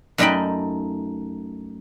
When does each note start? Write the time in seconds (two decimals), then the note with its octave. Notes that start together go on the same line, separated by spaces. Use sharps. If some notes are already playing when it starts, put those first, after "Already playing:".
0.18 F#2 A3 D#4 D#5 G5 B5